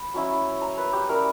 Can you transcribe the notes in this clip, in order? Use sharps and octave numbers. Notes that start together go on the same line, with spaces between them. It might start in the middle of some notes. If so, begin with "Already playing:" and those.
Already playing: B5
F#3 C#4 E4
A#5
B4
G4
G3 C#4 E4 A#4